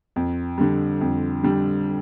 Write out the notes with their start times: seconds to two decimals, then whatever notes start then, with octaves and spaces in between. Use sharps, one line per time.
0.16 F2
0.58 D3 G3
1.01 F2
1.43 D3 G3